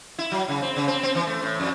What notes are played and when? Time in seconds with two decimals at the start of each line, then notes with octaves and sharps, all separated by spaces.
0.18 E4
0.32 F#3
0.49 C#3
0.62 C4
0.76 C#3
0.88 C4
1.03 C4
1.15 E3
1.27 A3
1.42 A2
1.60 F2